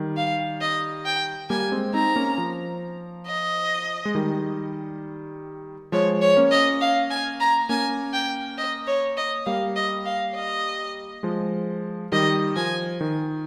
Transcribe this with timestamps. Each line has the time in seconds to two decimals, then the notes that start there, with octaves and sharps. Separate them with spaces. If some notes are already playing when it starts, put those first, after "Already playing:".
Already playing: D#3 G3
0.17 F5
0.61 D#5
1.06 G5
1.50 G3 A#3 G#5
1.72 G#3 C4
1.94 C4 D#4 A#5
2.16 A#3 C#4
2.38 F3
3.27 D#5
4.05 G#3
4.15 D#3 G3
5.92 F3 G#3 C#5
6.22 C#5
6.37 A#3 C#4
6.51 D#5
6.81 F5
7.11 G#5
7.40 A#5
7.69 A#3 C#4 G#5
8.13 G5
8.58 D#5
8.87 C#5
9.17 D#5
9.46 G3 A#3 F5
9.76 D#5
10.06 F5
10.35 D#5
11.23 F3 G#3
12.12 D#3 G3 D#5
12.56 F3 G#5
13.01 D#3